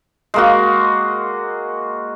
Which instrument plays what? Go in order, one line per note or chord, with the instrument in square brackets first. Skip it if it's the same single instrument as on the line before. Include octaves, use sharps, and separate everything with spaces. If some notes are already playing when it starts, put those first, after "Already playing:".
[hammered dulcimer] G#3 A#3 F#4